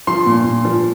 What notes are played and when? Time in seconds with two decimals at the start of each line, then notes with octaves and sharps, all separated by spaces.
0.07 F3 C6
0.26 A#2
0.45 A#2
0.65 F3